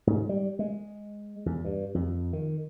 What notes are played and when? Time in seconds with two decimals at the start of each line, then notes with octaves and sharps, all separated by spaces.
0.07 G#2
0.29 G3
0.59 G#3
1.46 E2
1.65 G2
1.95 F2
2.33 D#3